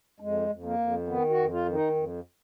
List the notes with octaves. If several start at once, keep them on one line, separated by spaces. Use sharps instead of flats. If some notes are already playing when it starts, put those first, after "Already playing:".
F2 G#3
F2
A#3
F2
D#3 B3
F#4
F2
F4
D#3
D#4
F2